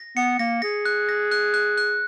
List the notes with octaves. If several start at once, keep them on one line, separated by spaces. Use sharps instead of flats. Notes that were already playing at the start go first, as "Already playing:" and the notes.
Already playing: A#6
B3 C#7
A#3 A#6
G#4 A#6
F#6
A#6
F#6
F#6
F#6